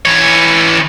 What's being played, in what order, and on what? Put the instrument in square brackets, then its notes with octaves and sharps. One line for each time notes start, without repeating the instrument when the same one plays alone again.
[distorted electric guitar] E3 C#5